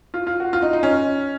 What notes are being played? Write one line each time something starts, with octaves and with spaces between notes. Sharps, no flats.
F4
F4
F#4
F4
D#4
D#4
C#4